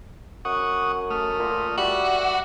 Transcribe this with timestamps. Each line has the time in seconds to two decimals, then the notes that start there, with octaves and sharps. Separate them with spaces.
0.45 F#2 F#5 C#6 D#6
1.10 A3 D#6 F6
1.39 A#2
1.78 G3 F#4 E5